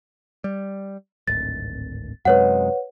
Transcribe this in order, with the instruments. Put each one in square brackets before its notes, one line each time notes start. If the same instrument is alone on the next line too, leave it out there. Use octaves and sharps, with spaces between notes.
[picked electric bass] G3
[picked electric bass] D1 G#1 [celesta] A6
[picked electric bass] F#2 C3 G#3 [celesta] B4 C#5 F#5